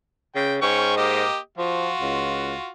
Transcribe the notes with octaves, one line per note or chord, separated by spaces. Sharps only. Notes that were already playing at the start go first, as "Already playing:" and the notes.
C#3 G5
G#2 C#4 G5 C#6
A#3 G4 D#5
F3 F4 F#4
C#2